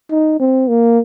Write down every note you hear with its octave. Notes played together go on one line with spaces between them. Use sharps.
D#4
C4
A#3